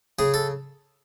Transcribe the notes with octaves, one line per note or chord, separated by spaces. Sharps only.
C#3 G#4
A4